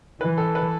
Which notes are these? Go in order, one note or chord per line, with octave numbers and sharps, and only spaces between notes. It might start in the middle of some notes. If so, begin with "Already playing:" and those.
E3 B4
A4
B4